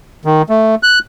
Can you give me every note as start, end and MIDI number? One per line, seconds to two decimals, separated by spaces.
0.25 0.42 51
0.49 0.75 57
0.83 0.99 90